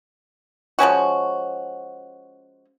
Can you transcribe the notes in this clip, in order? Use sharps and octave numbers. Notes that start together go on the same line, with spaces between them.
F3 G#3 C#4 F#4